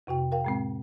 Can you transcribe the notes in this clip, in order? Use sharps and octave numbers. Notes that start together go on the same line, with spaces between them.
F2 C3 F#4 G5
A#4 F5 G5
A2 G#3 C4